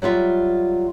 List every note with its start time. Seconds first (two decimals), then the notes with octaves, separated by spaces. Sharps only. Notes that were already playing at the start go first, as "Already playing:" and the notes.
0.02 F#3 G3 F4 E5